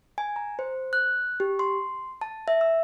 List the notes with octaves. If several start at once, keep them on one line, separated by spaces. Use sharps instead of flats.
G#5
A#5
C5
F#6
G4
C6
A5
E5
E6